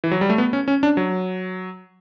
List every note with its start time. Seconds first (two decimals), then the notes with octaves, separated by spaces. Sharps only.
0.04 E3
0.11 F#3
0.21 G3
0.30 A3
0.38 B3
0.53 C#4
0.68 C#4
0.83 D4
0.97 F#3